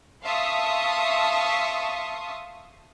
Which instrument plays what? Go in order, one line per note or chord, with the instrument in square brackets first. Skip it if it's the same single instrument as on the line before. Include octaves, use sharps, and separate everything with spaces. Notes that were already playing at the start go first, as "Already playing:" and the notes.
[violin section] E5 F5 A5 C6 C#6 D#6